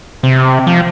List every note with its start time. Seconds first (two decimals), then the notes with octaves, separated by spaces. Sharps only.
0.23 C3
0.67 F3